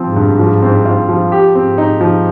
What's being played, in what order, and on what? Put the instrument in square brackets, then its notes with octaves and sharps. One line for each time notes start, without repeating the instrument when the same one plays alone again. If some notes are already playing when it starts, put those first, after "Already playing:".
Already playing: [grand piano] F3 C4 F4
[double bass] G#2
[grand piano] G2
F3
C4
F4
F3
[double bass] G#2 [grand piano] G4
[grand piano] C4
D#4
F3